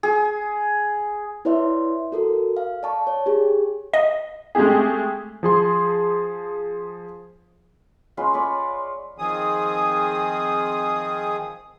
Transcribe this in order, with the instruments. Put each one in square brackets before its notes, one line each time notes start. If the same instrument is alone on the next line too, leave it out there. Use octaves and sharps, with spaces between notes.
[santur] G#4
[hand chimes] E4 B4 C#5 D5 E5 C6
F#4 A4 A#4
F5
D5 A5 C#6
C#5
G4 G#4
[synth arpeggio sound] D#5
[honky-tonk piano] G#3 A3 C4 G4 G#4
[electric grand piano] F3 G#4 C6
[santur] G#3 C#4 F4 B4
C#5 D5 B5 D6
[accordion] D#3 F3 C4 G#4 D#6